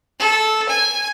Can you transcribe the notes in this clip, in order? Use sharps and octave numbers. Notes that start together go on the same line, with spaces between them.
A4
G#5